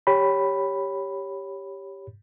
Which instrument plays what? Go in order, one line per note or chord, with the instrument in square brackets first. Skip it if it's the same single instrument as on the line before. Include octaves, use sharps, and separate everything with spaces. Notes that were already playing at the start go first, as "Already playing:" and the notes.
[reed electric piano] G4 C#5 B5